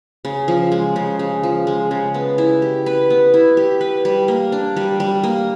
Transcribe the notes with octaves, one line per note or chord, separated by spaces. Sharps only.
C#3
F3
G#3
C#3
C#3
F3
G#3
C#3
B3
E4
G4
B4
B3
E4
G4
B4
G3
A#3
D4
G3
G3
A#3